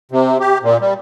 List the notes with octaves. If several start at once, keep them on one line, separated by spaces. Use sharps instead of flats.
C3
G4
A#2
G3